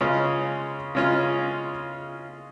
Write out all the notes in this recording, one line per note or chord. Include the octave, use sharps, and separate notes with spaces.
C#3 G#3 C#4 F4
C#3 G#3 C#4 F4